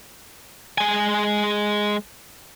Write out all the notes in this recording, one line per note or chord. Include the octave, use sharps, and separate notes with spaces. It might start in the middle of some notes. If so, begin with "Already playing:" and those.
G#3 G#5